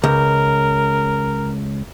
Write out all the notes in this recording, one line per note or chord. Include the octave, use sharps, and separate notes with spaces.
C#2 A#4